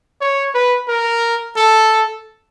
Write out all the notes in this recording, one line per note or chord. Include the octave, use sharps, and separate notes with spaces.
C#5
B4
A#4
A4